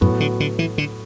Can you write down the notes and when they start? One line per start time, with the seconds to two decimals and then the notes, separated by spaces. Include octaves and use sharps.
0.01 F#2 A2 F#3 B3 F#4
0.20 D3
0.40 D3
0.59 E3
0.78 D3